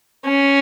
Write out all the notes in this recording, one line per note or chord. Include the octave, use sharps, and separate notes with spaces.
C#4